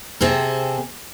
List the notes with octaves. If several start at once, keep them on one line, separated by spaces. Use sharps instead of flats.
C3 C4 G#4 A4